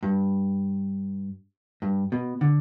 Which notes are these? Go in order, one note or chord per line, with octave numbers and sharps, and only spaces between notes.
G2
G2
B2
D3